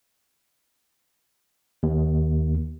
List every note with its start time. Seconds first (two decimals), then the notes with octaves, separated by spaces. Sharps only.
1.83 D#2